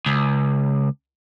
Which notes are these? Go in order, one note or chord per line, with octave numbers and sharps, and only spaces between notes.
C#2